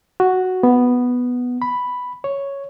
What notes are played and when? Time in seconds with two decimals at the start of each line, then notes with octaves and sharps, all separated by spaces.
0.20 F#4
0.63 B3
1.62 B5
2.24 C#5